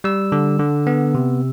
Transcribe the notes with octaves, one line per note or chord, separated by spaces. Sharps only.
G3 E6
D3
D3
B3
C3